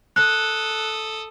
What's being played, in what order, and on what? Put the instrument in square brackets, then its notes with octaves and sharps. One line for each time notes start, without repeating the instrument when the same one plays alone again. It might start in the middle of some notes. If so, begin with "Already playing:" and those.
[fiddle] A4 D#6 [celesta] F#6